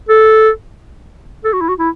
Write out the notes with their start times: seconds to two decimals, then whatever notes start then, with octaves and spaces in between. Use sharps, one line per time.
0.09 A4
1.44 A4
1.53 F#4
1.61 E4
1.69 F#4
1.79 E4